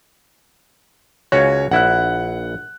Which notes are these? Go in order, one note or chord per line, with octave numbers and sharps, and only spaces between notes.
C#2 C#4 F#4 C#5
A#1 E4 F#5 F#6